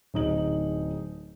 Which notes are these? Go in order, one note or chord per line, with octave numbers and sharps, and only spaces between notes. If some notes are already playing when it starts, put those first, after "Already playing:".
D1 D#4 F#7